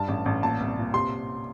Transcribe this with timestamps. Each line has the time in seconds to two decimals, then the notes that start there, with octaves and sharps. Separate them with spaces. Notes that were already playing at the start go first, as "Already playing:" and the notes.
Already playing: G2 A5
0.08 A1
0.26 A1
0.43 A#2 A5
0.60 C2
0.77 A#2
0.93 C3 C6